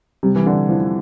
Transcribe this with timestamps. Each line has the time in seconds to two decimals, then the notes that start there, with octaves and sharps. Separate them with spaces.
0.23 C3 G3
0.36 E3
0.46 D3
0.69 F3 E4